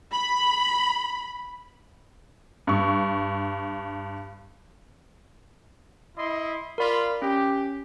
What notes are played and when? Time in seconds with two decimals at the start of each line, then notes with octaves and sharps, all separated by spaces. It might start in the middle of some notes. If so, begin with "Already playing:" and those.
0.13 B5
2.67 G2 C#6
6.15 E4 D#5 C6
6.78 F4 A#4 D5 B5
7.22 C#4 G4